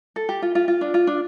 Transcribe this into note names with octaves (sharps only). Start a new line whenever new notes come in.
A4
G4
F4
F4
F4
D4
F4
D4